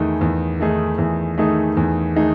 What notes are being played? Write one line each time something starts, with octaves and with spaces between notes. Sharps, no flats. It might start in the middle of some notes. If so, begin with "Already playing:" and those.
Already playing: E2 D#3 A3 D#4 G#4
E2
D#3 A3 D#4 G#4
E2
D#3 A3 D#4 G#4
E2
D#3 A3 D#4 G#4